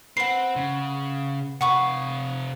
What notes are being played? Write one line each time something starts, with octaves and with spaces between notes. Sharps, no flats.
C4 B4 F#5 C7
C#3
C3 B4 F5 F#5 C#6 D#6